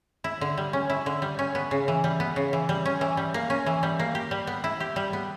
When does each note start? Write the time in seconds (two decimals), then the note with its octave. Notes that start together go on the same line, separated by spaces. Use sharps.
0.24 E4
0.41 D3
0.58 G3
0.73 C#4
0.90 E4
1.06 D3
1.22 G3
1.39 C#4
1.55 B3
1.71 C#3
1.88 E3
2.04 G3
2.20 B3
2.36 C#3
2.53 E3
2.69 G3
2.86 C#4
3.01 E3
3.17 G3
3.34 A#3
3.50 C#4
3.66 E3
3.83 G3
3.99 A#3
4.15 G4
4.31 G3
4.47 B3
4.64 E4
4.80 G4
4.96 G3
5.13 B3